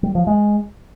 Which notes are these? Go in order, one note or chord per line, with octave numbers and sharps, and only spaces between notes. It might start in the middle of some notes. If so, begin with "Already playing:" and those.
G3
F3
G#3